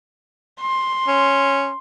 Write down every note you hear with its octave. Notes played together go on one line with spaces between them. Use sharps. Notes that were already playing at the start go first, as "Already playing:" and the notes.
C6
C#4